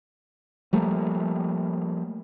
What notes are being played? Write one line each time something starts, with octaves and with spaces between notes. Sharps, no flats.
F3 G3 A3 A#3